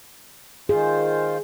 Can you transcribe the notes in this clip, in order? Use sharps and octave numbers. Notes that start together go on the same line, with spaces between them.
D#3 F4 G#4 C5